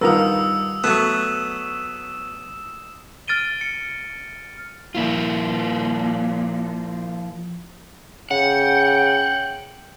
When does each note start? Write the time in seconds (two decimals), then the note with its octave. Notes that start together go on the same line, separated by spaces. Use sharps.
0.01 G2 D#3 F4 A#4 B4 F#5 D#6 E6
0.84 F#3 A3 B3 C#6 E7
3.28 F6 A6 D7 D#7 G7
3.61 C#7
4.95 A#2 F3 E4 F4
8.31 C#3 F#5 G5